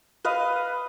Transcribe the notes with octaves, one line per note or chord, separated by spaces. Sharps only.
B4 D#5 F5